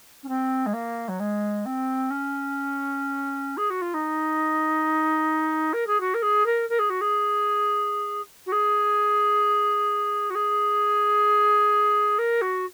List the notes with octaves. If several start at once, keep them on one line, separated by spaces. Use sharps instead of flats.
C#4
C4
G#3
A#3
F#3
G#3
C4
C#4
G#4
F#4
F4
D#4
A#4
G#4
F#4
A#4
G#4
A#4
A#4
G#4
F#4
G#4
F#4
G#4
F#4
G#4
A#4
F#4